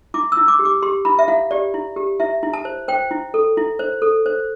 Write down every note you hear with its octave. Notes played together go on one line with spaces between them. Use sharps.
E4 D6
E6
E4
D6
G4
D6
G4 C6
E4 B5
E5
E4 F5
G4 D5
E4
G4
E4 E5
E4
A5
C5
C5 G5
E4
A4
E4
C5
A4
C5